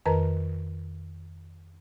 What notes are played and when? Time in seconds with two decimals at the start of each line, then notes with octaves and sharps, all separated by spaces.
0.06 F2 D#3 A#4 B4 A#5